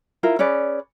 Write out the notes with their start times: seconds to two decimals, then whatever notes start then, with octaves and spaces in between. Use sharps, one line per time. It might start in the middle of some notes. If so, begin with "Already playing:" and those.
0.23 E4 F4 A#4
0.39 C#4 G#4 B4 D5